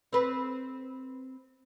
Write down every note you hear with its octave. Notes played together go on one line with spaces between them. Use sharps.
C4 B4